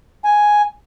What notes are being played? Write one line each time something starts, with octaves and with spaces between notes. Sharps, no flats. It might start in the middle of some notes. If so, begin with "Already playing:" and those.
G#5